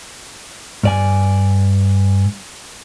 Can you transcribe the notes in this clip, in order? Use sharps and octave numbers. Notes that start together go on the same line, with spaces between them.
G2 D5 G#5